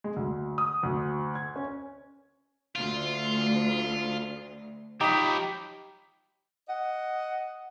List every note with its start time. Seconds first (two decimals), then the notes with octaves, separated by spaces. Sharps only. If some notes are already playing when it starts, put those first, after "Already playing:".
0.04 G#3
0.16 D2
0.58 D#6
0.83 D2
1.35 G#6
1.56 C#4
2.75 D2 F4
5.01 F3 F#3 D#4 G4 B5
6.68 D#5 F#5